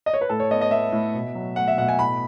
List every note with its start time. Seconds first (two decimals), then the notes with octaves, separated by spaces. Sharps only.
0.06 D#5
0.14 C#5
0.21 B4
0.29 A2 A4
0.40 C#5
0.51 B3 D#5
0.61 D#5
0.71 B3 E5
0.92 A2
1.14 B2
1.35 F#3
1.56 A3 F#5
1.68 E5
1.78 B2 F#5
1.88 G#5
1.99 A2 B5